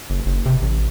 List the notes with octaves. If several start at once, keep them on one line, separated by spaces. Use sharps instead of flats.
F#1
F#1
C3
A1